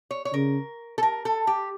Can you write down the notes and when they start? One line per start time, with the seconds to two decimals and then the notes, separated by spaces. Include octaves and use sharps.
0.11 C#5
0.25 C#5
0.33 C#3 A#4
0.98 A4
1.03 A#4
1.25 A4
1.47 G4